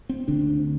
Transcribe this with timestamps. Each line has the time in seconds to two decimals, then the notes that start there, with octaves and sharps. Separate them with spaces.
0.09 C4
0.28 D2 D3 D4